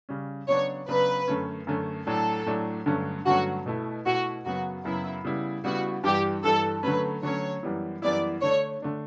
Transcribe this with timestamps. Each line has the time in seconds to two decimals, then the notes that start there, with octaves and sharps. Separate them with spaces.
0.09 C#3 G3 C#4
0.48 C#3 F#3 B3 D4 C#5
0.88 C#3 F#3 B3 D4 B4
1.28 F#2 D3 A3 C#4
1.67 F#2 D3 A3 C#4
2.07 A2 F#3 A3 D4 A4
2.46 A2 F#3 A3 D4
2.86 G2 D3 F#3 A3 C#4
3.26 G2 D3 F#3 A3 C#4 F#4
3.66 B2 A3 E4
4.06 B2 A3 E4 F#4
4.45 F#2 C#3 F#3 B3 F#4
4.85 F#2 C#3 F#3 B3 E4
5.25 C#3 G3 B3 E4
5.64 C#3 G3 B3 E4 F#4
6.04 G2 E3 G3 G4
6.44 G2 E3 G3 A4
6.83 D3 F#3 A3 C#4 B4
7.23 D3 F#3 A3 C#4 C#5
7.63 F#2 E3 G3 B3 E4
8.02 F#2 E3 G3 B3 E4 D5
8.42 D3 A3 D4 C#5
8.82 D3 A3 D4